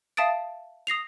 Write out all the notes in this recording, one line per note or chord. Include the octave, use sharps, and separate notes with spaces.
E5 F5 A5 D#6 A6 D7
D#6 A#6 C7 F7